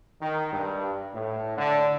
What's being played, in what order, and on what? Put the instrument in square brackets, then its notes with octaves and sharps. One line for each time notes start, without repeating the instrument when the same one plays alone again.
[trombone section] D#3
G2
A2
D3